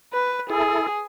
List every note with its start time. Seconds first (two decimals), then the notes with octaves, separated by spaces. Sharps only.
0.13 B4
0.50 E4 G#4 A4